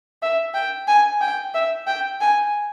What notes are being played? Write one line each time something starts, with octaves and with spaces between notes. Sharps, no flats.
E5
G5
G#5
G5
E5
G5
G#5